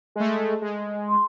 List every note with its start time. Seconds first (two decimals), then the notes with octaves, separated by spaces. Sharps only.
0.16 G#3 A3
0.62 G#3
1.09 C6